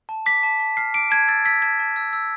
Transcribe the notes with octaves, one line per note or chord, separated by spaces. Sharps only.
A5
D6 B6
A5
A5
F6 C7
D6 D7
A5 G#6
E6 A6
E6 B6
A5 G#6
A5
E6
E6